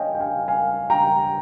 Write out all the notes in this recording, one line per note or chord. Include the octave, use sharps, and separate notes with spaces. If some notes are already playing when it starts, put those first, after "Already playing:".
Already playing: C#5 D#5 F5 G5 G#5
G5
F5 G#5
F5 G#5
G5 A#5